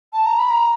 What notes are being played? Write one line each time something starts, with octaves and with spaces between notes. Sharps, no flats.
A5
A#5
B5
A#5